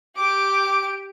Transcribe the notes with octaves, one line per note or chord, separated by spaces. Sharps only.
G4 D6 D7